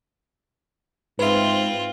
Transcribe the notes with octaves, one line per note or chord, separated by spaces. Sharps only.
G#2 C4 F4 B4 E5